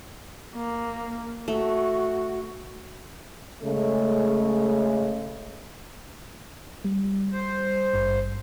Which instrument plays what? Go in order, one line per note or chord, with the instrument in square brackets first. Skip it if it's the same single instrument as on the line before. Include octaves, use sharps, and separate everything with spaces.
[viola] A#3
[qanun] A3 [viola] F#4
[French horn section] C#3 G#3 A3
[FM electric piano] G3
[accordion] C5
[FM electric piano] G#1 G2